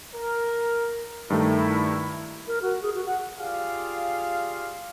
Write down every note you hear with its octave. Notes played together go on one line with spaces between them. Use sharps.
A#4
G2 D#3 A3 E4
A#4
F#4
G#4
F#4
F#5
F4 G4 G#4 D5 F5